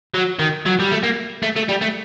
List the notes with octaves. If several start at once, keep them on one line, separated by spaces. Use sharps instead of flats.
F#3
D#3
F#3
G3
A3
A#3
A3
A3
G3
A3